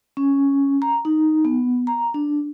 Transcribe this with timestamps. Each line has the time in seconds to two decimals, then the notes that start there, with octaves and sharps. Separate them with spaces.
0.17 C#4
0.82 A#5
1.05 D#4
1.45 B3
1.87 A#5
2.14 D4